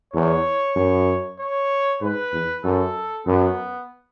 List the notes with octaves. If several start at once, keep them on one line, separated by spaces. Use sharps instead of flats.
E2 C#5
F#2
C#5
G#2 B4
E2
F#2 A4
F#2 B3